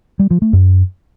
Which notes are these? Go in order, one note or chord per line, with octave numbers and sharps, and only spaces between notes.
G3
F3
A3
F#2